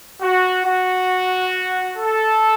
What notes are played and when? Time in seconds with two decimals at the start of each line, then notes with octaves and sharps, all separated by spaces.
0.22 F#4
0.66 F#4
1.98 A4